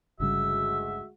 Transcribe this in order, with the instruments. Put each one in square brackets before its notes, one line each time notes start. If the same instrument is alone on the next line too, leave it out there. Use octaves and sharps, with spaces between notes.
[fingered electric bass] G1 C#3 G3 [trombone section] D2 G#3 F#4 [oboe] E5 [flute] E6